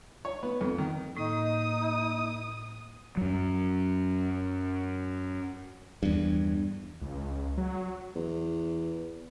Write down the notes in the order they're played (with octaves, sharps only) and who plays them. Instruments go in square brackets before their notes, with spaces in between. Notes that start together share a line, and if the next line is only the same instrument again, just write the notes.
[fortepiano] C#5
B3
F2
D#3
[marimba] A2 [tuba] A#3 [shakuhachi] D#4 [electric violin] D#6
[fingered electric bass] F#2 F#3
E2 G2
[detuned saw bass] C#2
F#3
[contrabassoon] E2